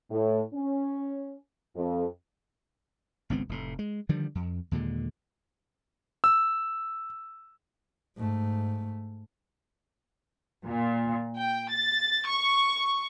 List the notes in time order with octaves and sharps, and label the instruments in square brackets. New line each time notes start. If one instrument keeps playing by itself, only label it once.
[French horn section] A2
C#4
F2
[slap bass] G#1 C#2 B3 C4
F1 A2
G#3
D3 D#3 F3 G3
F2
D#2 A#2 D3 G#3
[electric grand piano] E6
[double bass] G#2 A3
[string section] A#2
G5
A6
C#6